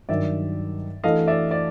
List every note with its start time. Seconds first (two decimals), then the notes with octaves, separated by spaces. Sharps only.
0.09 G2 D#3 F#3 D5 E5
1.04 E3 A3 D4 F#4 A4 D#5 F5
1.27 D5 E5
1.51 D5